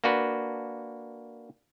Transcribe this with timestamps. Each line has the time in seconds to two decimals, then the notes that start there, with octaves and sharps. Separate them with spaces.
0.04 A#3 D4 F#4 B4